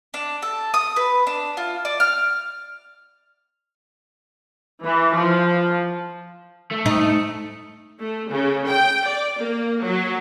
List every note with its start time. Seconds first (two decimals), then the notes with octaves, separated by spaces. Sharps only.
0.14 D4
0.42 A4
0.74 D#6
0.96 B4
1.27 D4
1.57 F4
1.85 D5
2.00 F6
4.84 E3
5.18 F3
6.72 A3
6.86 D#4
8.00 A3
8.30 C#3
8.69 G5
9.07 D5
9.40 A#3
9.82 F#3